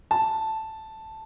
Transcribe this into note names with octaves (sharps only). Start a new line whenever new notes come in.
A5